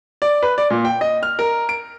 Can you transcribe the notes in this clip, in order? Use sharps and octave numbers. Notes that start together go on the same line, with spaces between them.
D5
B4
D5
A#2
G5
D#5
F6
A#4
D7